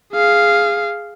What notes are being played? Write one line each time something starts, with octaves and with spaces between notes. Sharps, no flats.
G#4 F5